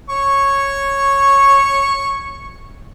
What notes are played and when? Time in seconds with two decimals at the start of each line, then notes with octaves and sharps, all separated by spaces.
0.10 C#5 C#6